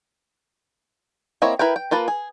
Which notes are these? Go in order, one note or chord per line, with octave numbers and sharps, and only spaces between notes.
A#3 C4 E4 C#5 D#5
E4 A#4 B4 G5
G5
A#3 F4 B4 A5
G#4